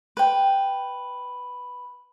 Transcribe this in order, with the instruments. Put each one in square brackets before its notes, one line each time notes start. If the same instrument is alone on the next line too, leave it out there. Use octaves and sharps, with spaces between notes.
[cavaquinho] B4 G5